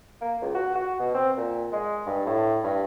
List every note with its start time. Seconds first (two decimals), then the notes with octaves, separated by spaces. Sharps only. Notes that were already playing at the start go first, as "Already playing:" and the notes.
0.22 A#3
0.42 C#2
0.55 F#4
0.75 F#4
1.00 B2
1.14 C4
1.37 A#2
1.73 G#3
2.06 G2
2.26 A2
2.64 G2